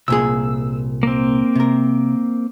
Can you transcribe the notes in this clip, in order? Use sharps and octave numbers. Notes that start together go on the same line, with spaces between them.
C2 A#2 G#4 E6
A#3 C4
C3 A#4